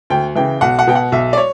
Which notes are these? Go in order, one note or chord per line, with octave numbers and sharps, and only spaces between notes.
D2 G5
C#3 E3 G5
B1 F#5
F#5
B2 G5
F#5
B1 E5
D5
C#5